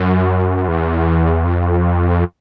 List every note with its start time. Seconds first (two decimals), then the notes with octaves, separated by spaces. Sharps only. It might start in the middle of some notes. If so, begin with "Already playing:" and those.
Already playing: F#2
0.68 E2
1.44 F2